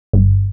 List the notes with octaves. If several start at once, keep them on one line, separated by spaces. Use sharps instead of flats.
G1